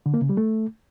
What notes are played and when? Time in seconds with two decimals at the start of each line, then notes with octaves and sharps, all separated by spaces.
0.06 D3
0.14 A#3
0.22 C#3
0.29 G3
0.37 A3